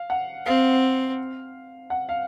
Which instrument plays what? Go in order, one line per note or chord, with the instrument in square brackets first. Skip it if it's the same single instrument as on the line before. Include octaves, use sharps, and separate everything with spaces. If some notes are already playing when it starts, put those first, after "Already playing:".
Already playing: [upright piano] F5
F#5
[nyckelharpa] C4 [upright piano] F5
[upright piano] F#5
F5